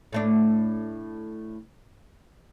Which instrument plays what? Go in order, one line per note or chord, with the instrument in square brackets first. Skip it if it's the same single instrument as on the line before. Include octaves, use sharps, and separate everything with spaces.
[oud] A2 A3 D4